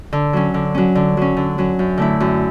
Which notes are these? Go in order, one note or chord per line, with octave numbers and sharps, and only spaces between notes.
D3
F#3 C#4
D3
F#3 C#4
D3
F#3 C#4
D3
F#3 C#4
F#2
D3 A3 E4
F#2